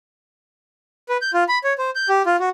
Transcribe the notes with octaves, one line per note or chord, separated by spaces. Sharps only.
B4
G6
F4
B5
C#5
C5
G6
G4
F4
F#4